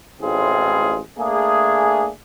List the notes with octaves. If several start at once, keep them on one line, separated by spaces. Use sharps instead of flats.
A1 A2 G#3 C4 F4 G#4
A3 A#3 D4 G#4